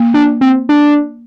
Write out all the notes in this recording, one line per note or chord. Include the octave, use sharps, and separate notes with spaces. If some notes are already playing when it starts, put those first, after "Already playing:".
Already playing: A#3
D4
C4
D4